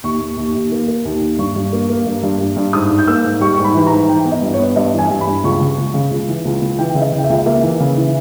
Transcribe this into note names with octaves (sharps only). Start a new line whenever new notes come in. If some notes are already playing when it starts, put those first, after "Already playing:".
D#2 C#6
D#2
D#2
D#2
A#3
A#3
D#2
D#2
G2 C#6
G2
A#3
A#3
G2
G2
G2
G2
G#2 D#6
G#2
G6
A#3 E6
G#2
G3 C#6
C#6
G#2
B5
E3
A#5
G#2
E3 G5
B3
D#5
G2
C#5
B3
G2 D#5
E3
G#5
G2
B5
G2
C#2 C#6
C#3
C#2
C#3
C#2
E3
C#2
C#2
E3 G5
C#3 E5
D#5
C#3
G5
E5
C#2
A#3 E5
E3
C#3
E3